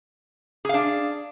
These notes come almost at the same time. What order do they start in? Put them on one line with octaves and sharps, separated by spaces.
G#4 F5 D4